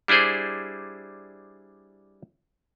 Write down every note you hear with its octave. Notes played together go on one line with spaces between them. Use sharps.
G3 D4 E4 G#4 C5